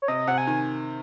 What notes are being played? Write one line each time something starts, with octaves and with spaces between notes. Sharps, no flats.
C#5
C3 D#5
C3 F#5
G#5
D#3